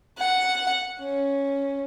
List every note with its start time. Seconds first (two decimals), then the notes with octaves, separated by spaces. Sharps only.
0.18 F#5
1.00 C#4